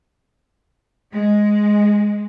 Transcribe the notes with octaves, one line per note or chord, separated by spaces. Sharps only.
G#3